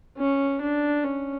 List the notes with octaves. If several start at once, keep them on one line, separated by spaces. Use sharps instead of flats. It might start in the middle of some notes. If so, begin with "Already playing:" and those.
C#4
D4
C#4